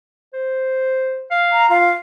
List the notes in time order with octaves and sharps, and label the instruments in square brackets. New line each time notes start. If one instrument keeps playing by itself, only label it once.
[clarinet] C5
F5
[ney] A#5
[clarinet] F4 [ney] F5